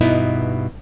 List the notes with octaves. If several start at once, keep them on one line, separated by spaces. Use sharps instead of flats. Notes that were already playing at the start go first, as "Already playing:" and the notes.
G2 B2 B3 D#4 E4